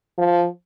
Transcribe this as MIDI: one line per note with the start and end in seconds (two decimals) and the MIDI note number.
0.18 0.47 53